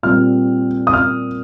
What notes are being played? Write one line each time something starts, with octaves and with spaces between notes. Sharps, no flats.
A#2 G3 C4 F6
D#6
F6